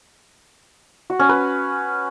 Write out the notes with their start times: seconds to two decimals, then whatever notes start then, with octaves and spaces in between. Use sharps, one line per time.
1.10 F#4
1.20 C#4
1.29 B4